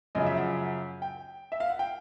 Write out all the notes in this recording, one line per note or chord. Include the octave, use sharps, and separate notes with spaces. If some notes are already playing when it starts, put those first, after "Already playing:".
F#2 C#3 F3 D#5
E5
F#5
F#5
G5
E5
F5
F#5
G5